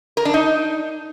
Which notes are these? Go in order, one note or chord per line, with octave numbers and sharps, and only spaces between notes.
A#4
D4
D#4